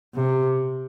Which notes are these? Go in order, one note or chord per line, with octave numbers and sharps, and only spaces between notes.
C3